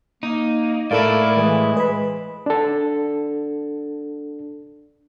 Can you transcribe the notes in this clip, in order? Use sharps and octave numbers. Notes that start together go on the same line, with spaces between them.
A#3 D#4
A2 E4 A4 A#4 D5 F5
E3 G#3
B4 B5
D4 A4